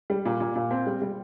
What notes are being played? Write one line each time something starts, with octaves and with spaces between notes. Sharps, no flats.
G3
A#2
A#2
A#2
C4
G3
G3